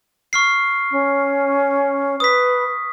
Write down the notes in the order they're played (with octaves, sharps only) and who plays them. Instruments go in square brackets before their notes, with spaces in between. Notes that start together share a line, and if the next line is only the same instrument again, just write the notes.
[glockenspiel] C#6 F6 C7
[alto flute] C#4
[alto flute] B4 [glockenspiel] D#6 B6